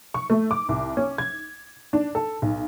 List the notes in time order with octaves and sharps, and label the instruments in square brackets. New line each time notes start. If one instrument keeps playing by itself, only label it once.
[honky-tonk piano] C#6
A3
D6
C2
C#4
G#6
D4
A4
B1